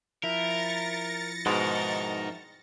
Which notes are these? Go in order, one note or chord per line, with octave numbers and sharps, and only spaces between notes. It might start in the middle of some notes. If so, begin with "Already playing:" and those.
F3 E4 A#4 A6 A#6 C#7
G#2 B2 G#3 D#4 A#4